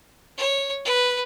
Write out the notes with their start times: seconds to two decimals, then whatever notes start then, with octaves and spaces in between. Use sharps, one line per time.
0.38 C#5
0.85 B4